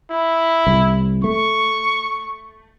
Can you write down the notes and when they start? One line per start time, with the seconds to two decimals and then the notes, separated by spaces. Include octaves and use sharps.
0.11 E4
0.67 C2
1.24 A3 C#6